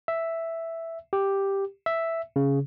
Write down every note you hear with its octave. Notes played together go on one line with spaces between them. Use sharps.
E5
G4
E5
C#3